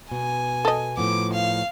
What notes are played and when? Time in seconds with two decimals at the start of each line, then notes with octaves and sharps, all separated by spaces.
0.12 B2 G#5
0.65 A4 D#5
0.98 A2 F3 B3 D6
1.33 F5